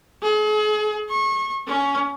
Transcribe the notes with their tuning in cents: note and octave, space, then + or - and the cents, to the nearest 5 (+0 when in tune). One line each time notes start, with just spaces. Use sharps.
G#4 +40
C#6 -30
C#4 +15